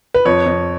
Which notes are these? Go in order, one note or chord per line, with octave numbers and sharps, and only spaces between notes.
B4
F2 C#5
F2